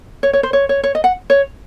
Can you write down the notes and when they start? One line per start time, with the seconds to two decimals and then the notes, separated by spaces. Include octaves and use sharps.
0.23 C#5
0.33 C#5
0.43 C5
0.53 C#5
0.69 C#5
0.84 C#5
0.95 D#5
1.04 F#5
1.30 C#5